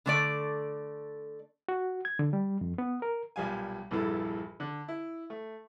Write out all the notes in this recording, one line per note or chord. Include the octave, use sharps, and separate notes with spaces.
D3 A3 D5
F#4
G#6
D3
G3
F2
B3
A#4
B1 A#2 G3 F5 G#5
A#1 E2 G2 E3 A4
D3
E4
A3